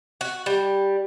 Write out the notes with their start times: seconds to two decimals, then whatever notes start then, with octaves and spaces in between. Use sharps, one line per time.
0.21 F#4
0.46 G3